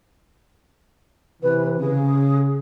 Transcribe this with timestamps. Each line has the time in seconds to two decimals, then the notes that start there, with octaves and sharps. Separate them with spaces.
1.43 C3 E3 B4
1.80 C#3 G#4